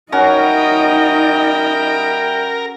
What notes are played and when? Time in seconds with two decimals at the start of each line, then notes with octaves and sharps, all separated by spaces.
0.12 G3 C#4 D#4 F#4 A#4 D#5 E5 G5